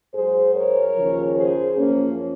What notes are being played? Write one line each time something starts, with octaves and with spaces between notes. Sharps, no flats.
G#2 F#3 G#4 C5
A#4 C#5
D#2 C#3 F3
G#4 C5
F#2 F3 A#3 C#4